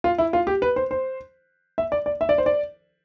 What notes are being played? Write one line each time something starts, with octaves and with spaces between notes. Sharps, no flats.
F4
E4
F4
G4
B4
C5
C5
E5
D5
D5
E5
D5
C5
D5